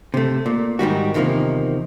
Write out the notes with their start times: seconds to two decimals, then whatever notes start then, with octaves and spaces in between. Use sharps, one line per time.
0.14 C3 A3
0.46 A#2
0.79 G#2 D#3 G3 F#4
1.14 E2 C3 D#3 F3 G#3 A#3